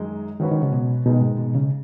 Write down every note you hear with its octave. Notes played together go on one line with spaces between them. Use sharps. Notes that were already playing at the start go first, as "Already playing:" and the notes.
Already playing: F#2 D#3 G#3 D#4
G#2 D#3 F#3 C#4 F#4 B4
D#3
C#3
B2
B2 D#3 G#3 D#4
G#2
B2
C#3